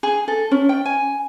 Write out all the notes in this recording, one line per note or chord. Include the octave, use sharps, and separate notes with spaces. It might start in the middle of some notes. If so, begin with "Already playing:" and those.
G#4
A4
C#4
G5
G#5